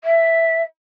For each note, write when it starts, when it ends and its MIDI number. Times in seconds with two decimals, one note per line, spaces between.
0.04 0.63 76